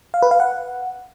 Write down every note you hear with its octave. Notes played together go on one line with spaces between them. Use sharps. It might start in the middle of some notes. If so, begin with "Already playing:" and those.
F5
B4
F5
F#5